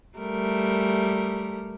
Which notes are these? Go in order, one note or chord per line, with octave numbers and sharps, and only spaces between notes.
G3 A3 A#4